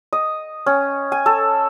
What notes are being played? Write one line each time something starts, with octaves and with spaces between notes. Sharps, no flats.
D#5
C#4
G#5
A4